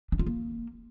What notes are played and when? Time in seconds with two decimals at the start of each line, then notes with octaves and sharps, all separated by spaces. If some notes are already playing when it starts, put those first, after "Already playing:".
0.12 D4
0.19 F4
0.27 A#3